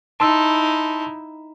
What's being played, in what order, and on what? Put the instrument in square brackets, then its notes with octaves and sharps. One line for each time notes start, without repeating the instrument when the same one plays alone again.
[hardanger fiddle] D#4 E4 [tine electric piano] A5 C6 E6